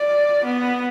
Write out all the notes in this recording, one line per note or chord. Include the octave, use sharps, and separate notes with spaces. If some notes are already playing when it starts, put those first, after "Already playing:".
Already playing: D5
B3